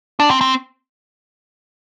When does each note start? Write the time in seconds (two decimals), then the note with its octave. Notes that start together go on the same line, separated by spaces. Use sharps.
0.20 D4
0.31 C4
0.41 C4